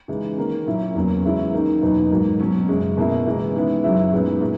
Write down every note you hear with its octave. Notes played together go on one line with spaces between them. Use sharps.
C#3 E3 G#3 D#4
D#3 A#3 C#4
A#2 F#3 C#4 E4
E2 C#3 F#3 A#3 C#4
C#3 E3 G#3 C#4 E4
D#3 A#3 D#4
E2 B2 F#3 B3 D#4
G#2 F#3 A#3
B2 F#3 C#4
F#2 C#3 G#3
B2 A#3 E4
C#3 E3 G#3
D#3 G#3 B3 E4
F#2 C#3 F#3 C#4 E4
A#2 G#3 B3 D#4
A#2